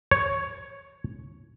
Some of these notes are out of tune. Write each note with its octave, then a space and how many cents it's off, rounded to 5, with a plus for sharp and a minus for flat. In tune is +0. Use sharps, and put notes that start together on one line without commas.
C#5 +0